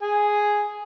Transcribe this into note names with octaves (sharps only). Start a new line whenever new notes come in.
G#4 G#5